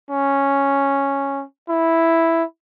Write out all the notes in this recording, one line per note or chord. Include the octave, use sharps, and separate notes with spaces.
C#4
E4